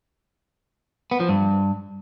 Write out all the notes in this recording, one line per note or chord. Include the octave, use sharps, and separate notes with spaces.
B3
F3
G2